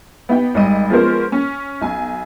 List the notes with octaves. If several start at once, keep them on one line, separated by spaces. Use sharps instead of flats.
B3 D#4 G4 G5
G#1 G3 D#5 D#7
F3 G#3 B3 C#4 A#4 C5
C#4
B1 G#5